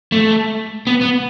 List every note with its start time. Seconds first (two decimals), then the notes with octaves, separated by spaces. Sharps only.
0.12 A3
0.87 B3
1.01 B3